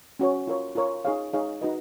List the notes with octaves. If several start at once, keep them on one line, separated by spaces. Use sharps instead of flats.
C#4 F#4 C#5
F4 A#4 C#5
F4 A#4 C#5
D#4 G#4 C#5 F5
D#4 G#4 C#5 F5
D#4 F#4 B4 D#5